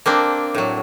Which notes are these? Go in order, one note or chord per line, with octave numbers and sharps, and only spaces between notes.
A#3 C4 D4
A2 F#3